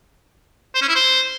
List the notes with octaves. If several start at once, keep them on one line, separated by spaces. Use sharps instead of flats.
C5
C#4
E4
C5